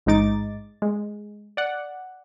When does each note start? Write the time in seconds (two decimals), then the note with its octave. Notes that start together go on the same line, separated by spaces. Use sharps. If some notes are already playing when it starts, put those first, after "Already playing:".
0.06 A1 G#2 G#3 D#4 D6 A6
0.82 G#3
1.57 D5 F#5